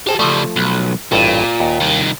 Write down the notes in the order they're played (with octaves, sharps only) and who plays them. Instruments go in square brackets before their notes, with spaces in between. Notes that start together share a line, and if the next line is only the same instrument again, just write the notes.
[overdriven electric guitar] G4 A5 [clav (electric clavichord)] G#4 C5 G5
[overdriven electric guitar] C#3 G3 [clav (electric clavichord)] F3 A3
[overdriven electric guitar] B1
[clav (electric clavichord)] A1 G2 [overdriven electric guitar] A#2
[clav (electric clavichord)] D#2
[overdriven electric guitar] C2 D#3